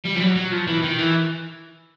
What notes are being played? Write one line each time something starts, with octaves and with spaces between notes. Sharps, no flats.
G3
F3
F#3
F#3
F3
E3
D#3
E3